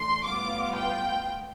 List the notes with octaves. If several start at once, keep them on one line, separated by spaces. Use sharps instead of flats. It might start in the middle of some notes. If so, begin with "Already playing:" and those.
Already playing: E3 A3 D4 C6
A2 G3 B3 F4 D6
G5